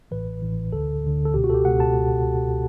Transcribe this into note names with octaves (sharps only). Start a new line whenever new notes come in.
A1 A2 E3 B4
A1 A2 E3
D2 D3 A4
D2 D3
A4
C#2 B2 G4
F#4
A4
G4
C#2 B2 F#5
A5